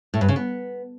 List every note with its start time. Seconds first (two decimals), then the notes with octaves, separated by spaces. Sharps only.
0.14 A2
0.21 G2
0.29 C#3
0.36 B3